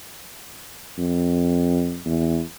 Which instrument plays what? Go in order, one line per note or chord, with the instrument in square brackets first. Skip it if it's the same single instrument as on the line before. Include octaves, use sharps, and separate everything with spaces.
[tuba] F2
E2